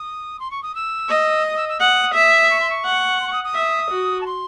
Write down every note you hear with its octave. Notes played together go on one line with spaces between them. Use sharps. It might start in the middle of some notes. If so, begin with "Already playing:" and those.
Already playing: D#6
C6
C#6
D#6
E6
D#5
D#6
E6
E6
F#5 D#6
E5
C#6
C6
C#6
F#5
C6
C#6
D#6
D#6
E5
F#4
A5
C6